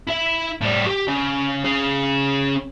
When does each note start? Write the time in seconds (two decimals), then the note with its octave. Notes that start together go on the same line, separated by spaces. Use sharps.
0.08 E4 E5
0.61 A2 G3
0.87 G4
1.08 C#3
1.65 C#4 G#4